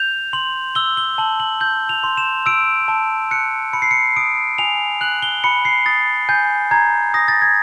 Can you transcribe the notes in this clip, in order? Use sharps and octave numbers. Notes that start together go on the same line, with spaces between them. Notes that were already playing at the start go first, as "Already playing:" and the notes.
Already playing: G6 F7
C6 F#7
E6 G7
G7
A5 F#7
F#7
G6 F#7
F7
C6
E7
E6 D7
A5
F#6 C#7
B5 C#7
C7
C#7
D#6 D7
G#5 F7
F#6 F#7
G7
B5 C#7
C7
D#6 A6
G#5 G6
A#5 G#6
D#6 A#6
A6
G#6